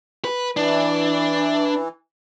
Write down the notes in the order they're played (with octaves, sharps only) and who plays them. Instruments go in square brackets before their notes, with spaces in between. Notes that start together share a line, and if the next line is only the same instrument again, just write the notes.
[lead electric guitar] B4
[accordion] E3 [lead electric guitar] D4